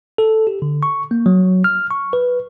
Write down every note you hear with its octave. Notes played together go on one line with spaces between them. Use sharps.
A4
G4
D3
C#6
A#3
F#3
F6
C#6
B4